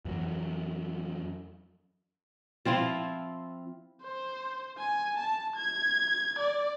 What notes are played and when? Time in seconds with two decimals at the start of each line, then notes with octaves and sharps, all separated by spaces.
0.05 F2 E3 F#3
2.65 F3 C4 E4 F4
4.03 C5
4.79 G#5
5.19 A5
5.57 G#6
6.39 D5